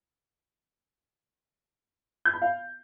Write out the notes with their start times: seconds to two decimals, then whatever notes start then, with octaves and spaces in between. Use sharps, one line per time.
2.25 G6
2.34 B5
2.42 F5